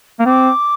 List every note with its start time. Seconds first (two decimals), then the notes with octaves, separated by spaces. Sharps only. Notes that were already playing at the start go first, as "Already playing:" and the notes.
0.20 A#3
0.26 C4 D6